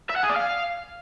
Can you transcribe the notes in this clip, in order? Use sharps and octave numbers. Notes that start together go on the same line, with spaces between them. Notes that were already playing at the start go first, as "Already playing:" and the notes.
E5
F#5
G#4
D5
F5